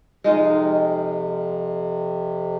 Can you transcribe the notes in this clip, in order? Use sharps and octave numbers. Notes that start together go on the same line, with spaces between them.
F2 C3 G#3 D#4 F4